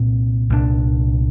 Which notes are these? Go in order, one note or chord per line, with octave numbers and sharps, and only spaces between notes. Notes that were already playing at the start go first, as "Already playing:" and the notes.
Already playing: C2 A#2 C4
C2 A#2 G3 D4